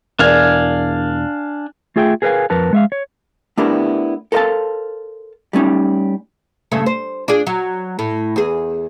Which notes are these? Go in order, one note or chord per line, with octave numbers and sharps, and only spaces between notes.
E1 E2 D4 A#4 D5 F5 G#5
A3 F4 G#4 E5 G5
G#4 A#4 B4 C#5 F5 G#5
F2 A#4 B4 A5
G#3 E5 F5
C#5
A3 B3 D4 E4 G4 A#4
A4 A#4 C5 D#5 F5 A5
G3 A3 C#4 D#4
G2 C#3 A3
C5
D4 F4 G#4
F#3
A2
E2 G#4